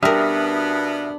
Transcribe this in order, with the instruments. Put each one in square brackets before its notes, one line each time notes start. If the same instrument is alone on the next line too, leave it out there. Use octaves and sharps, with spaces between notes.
[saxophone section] B2 B3 [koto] G3 A#4 [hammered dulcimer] D4 [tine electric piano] E5 D#6 F6